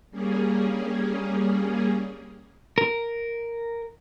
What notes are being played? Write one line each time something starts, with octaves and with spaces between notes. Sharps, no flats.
G3 A#3 C#4 G#4
A#4